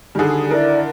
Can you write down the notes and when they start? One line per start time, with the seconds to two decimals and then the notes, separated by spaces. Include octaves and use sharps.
0.15 D3 D#3 G3 G#4
0.51 E4 A#4 D5 A5